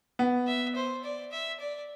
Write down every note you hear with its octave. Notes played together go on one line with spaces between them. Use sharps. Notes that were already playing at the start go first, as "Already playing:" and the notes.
B3
E5
C5
D5
E5
D5